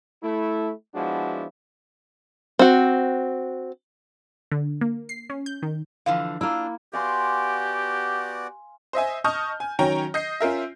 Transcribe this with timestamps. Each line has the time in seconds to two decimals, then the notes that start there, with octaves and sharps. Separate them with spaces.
0.23 A3 E4
0.95 F3 G#3 B3 D4 E4 F#4
2.59 C4 F#4
4.51 D3
4.81 A#3
5.09 C7
5.30 C#4
5.46 G6
5.63 D#3
6.06 D3 E3 F3 F5
6.41 A#3 D4 E4 F4
6.93 B3 F#4 G4 D5 F5 G#5 C6
8.93 C5 D#5 E5 G#5
9.24 D#5 A5 C#6 D#6 F6 G6
9.60 G#5
9.79 D#3 F#3 C#4 C#5 G5 A#5
10.14 D#5 G6 C7
10.41 C#4 F4 A#4 E5